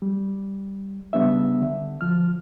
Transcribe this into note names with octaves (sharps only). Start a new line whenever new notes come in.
G3
C2 C#3 G3 B3 D4 E5
D3
D2 F3 F6